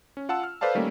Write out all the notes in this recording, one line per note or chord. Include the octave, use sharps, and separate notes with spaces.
C#4
F4 F#5 A5 E6
F6
A4 B4 C5 D5 F5 A5
D#3 G3 A3 A#3 C#4